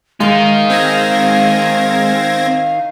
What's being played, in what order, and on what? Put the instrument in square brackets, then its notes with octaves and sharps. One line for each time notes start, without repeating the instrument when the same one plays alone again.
[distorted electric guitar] D#3 D#4 [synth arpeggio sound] G#3 [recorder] F5
[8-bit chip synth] C4 G#6 A#6